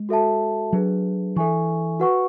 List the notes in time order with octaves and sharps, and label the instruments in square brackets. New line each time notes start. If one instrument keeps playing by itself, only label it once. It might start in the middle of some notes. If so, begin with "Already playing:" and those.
Already playing: [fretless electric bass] G#3
[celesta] F#4 A4 E5 A5
[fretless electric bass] F#3 [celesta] D4 G#4 B4
[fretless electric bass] E3 [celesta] A4 E5 G#5 C#6
[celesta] F#4 B4 F#5 C#6